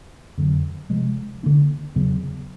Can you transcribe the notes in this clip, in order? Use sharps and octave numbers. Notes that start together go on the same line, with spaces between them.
F2 D3 F#3
C3 F3 G#3
D3 F#3 A#3 D4
E2 C#3 F#3 B3